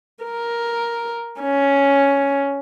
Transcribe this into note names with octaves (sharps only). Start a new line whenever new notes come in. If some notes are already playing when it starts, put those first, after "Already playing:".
A#4
C#4